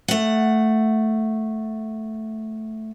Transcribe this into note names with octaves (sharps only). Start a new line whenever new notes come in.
A3 F#5